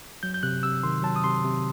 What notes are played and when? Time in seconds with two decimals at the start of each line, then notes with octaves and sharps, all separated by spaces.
0.23 F#3 G6
0.34 G6
0.43 C3 F#6
0.63 C3 E6
0.83 D#3 C6
1.03 F#3 A5
1.16 D#6
1.24 C3 C6
1.44 C3